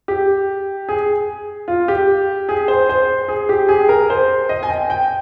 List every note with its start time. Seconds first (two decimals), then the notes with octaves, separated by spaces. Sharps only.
0.08 G4
0.89 G#4
1.68 F4
1.88 G4
2.49 G#4
2.68 C5
2.89 C5
3.28 G#4
3.49 G4
3.69 G#4
3.89 A#4
4.10 C5
4.49 D#5
4.63 G#5
4.70 G5
4.90 G5